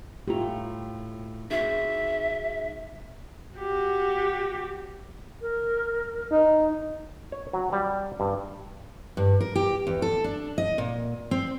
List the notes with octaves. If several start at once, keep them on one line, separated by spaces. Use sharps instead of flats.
A2 A3 F4 G4 A#5
D#4 F#4 G#4 E5
F#4 G4
A#4
D#4
C#5
F#3
G3
G2
G2
A#4
G4
E2
A4
D4
D#5
A#2
C4